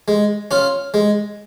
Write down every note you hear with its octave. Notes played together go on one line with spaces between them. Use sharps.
G#3
C#4 F4
G#3